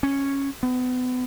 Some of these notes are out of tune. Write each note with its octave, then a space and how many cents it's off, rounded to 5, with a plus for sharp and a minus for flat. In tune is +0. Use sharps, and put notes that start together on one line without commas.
C#4 -5
B3 +35